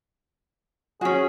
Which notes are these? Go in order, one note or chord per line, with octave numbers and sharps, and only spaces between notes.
C#4 F#4 G#4